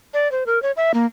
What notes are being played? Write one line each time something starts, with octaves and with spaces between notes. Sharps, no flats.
D5
C5
A#4
C#5
E5
A#3